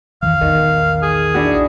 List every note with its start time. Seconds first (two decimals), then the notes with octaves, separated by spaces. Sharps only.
0.23 F2 D#3 E3 F5
0.41 A#1 E2 D#3
1.03 G#4
1.34 D4 E4 F#4